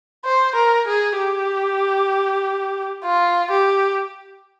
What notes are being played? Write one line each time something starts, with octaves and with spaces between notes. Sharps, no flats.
C5
A#4
G#4
G4
F4
G4